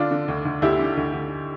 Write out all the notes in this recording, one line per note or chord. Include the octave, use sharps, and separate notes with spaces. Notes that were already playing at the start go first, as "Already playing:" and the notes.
Already playing: D3 D4 F4
D3
D2
D2
D2 E4 G4
D3
D2
D2